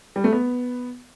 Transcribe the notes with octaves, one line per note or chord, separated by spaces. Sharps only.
G3
A3
B3